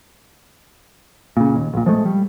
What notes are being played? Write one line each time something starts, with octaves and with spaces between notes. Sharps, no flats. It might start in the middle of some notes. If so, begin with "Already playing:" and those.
A#2 C#3
D#2
A#1 A#2
F3 G#3 A3
G3